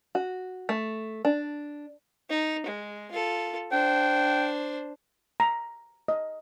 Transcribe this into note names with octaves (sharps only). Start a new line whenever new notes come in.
F#4
A3
D4
D#4
G#3
F4 A4
D4 C5 G5
A#5
D#5